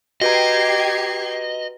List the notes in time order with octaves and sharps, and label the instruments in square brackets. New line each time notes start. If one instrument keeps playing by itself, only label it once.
[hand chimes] F#4 B4 A#5 [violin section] G4 G#6 C7 [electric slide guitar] D#5